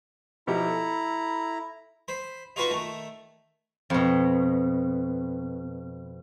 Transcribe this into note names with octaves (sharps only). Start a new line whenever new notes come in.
B2 F3 E4 G4 A#5
A4
C5 B5
D#4 F4 F#4 B4 F#5 C#6
D#3 A3
F2 B2